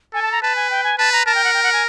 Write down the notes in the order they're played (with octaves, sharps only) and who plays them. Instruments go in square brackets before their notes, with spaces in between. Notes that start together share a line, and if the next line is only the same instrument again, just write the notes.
[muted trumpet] A4 [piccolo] G#5
[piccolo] A5
A#5
[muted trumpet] B4 [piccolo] A5
[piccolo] G#5
G5
G#5
[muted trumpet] B4 [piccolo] A5
[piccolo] A#5
[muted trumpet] A#4 [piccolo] A5
[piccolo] G5
F#5
G5
F#5
G#5